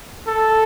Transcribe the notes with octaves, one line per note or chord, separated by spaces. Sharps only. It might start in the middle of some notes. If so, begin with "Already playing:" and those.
A4